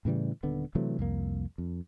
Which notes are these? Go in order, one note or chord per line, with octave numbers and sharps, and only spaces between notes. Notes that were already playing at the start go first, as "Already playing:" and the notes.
A2 C#3 E3 G3
D#1 D3 B3
C3 E3 F#3 A3
C2 F2 A#3
F2